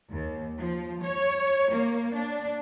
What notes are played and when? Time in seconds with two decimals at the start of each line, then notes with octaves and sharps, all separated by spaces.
0.11 D#2
0.58 F3
1.02 C#5
1.71 A#3
2.14 D4